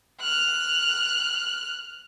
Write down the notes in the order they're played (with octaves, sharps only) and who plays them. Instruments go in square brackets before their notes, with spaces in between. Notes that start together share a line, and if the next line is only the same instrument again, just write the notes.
[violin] F6 F#6